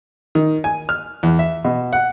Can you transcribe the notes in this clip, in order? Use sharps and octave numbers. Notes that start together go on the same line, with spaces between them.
D#3
G#5
F6
E2
E5
B2
F#5